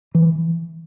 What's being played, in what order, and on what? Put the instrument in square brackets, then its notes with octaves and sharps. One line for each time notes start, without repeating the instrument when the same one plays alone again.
[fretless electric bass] E3